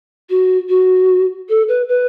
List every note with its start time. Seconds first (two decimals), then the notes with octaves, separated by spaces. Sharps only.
0.30 F#4
0.69 F#4
1.49 A4
1.68 B4
1.89 B4